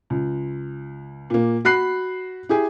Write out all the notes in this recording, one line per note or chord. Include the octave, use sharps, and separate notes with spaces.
C#2
A#2 A#3
F#4 B5 F#6 C7
E4 G4 G#4